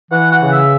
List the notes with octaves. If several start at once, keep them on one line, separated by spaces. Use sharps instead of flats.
E3 F#5
F#5
C#3
E5